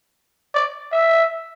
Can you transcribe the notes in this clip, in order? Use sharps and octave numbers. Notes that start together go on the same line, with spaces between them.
D5
E5